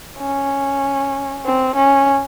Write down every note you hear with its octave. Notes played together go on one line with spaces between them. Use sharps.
C#4
C4
C#4